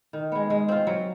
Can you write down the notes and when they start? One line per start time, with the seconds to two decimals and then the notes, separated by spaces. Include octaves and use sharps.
0.13 D#3
0.32 G#3 B3
0.50 G#3
0.68 C4 F4
0.87 F#3